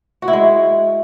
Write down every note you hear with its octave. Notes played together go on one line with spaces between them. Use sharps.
F#4
E4
G#3